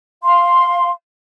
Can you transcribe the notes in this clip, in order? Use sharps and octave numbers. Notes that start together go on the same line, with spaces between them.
F5 C6